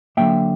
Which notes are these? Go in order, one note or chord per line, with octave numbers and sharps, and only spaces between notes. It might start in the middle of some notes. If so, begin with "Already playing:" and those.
D3 F#3 A#3 E5 G5